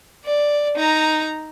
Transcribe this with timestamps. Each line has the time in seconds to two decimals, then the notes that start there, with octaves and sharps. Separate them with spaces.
0.25 D5
0.76 D#4 A#5